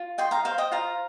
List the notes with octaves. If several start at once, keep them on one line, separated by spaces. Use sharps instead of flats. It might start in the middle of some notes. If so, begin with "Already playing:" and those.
Already playing: F4
D#5 G5 C6
F5 A#5
C5 F5
D#5 G5
F4 F5 A#5